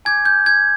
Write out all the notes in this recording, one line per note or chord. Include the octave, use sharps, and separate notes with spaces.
G#5 D6 G6 G#6
G6
G#6